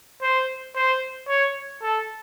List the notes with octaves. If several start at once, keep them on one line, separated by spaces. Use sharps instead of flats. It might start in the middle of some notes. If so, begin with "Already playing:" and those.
C5
C5
C#5
A4